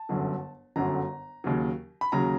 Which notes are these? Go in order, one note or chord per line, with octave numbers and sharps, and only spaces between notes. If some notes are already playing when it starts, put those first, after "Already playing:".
Already playing: A5
G1 F#2 D3 F#3
G1 F#2 D3 F#3 A#5
D#2 C#3 F#3
B5
D#2 C#3 F#3 A#5